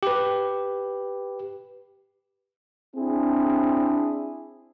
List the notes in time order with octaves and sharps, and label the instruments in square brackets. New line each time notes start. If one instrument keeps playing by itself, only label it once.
[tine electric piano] G4 B4
[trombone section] C4 D4 E4 G#4